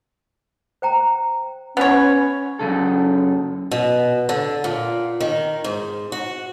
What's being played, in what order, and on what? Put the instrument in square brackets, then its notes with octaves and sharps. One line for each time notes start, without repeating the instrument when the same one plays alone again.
[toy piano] C5 G5 A#5
[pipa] B3 C#5 [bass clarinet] C#4 [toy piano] F#5 B5
[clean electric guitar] F#2 C#3 A4
[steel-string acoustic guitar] B2
D3
A#2
D#3
G#2
F#4